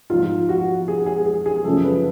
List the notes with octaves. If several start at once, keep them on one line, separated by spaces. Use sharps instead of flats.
G#2 F3 F4
F#4
G#4
G#4
G#4
G#4
F#2 C#3 F3 A4
B4